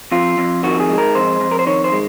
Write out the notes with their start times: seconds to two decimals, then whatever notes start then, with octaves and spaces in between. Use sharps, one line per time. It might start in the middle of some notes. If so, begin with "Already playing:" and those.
0.12 F2 F4
0.38 F2
0.63 D#3 F#4
0.80 G#4
0.90 G#3
0.98 A#4
1.15 F2 C5
1.41 F2
1.51 A#4
1.59 C5
1.67 D#3 C#5
1.84 C5
1.92 G#3